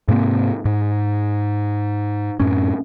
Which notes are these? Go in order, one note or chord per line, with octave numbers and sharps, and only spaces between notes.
G#2 C3 A#3 C4
G#2
F#2 A2 C#4